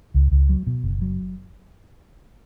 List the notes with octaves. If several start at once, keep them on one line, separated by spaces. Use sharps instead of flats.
C#2
C#2
F#3
B2
F#1
F#3